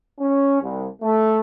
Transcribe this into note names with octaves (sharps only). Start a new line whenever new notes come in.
C#4
C2
A3